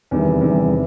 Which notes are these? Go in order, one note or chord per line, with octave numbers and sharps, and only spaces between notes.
E2 C3 D#3 G3
E2 C3 D#3 G3
C3